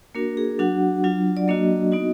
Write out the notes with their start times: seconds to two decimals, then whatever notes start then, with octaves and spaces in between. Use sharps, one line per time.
0.15 A#3 D4 F#4 A#4
0.37 G#4
0.59 F#3 D4 F#4 F#5
1.04 F#3 D4 F4
1.37 D5
1.48 F#3 A#3 D4 F#4 D#5
1.92 B3 D#4 F#4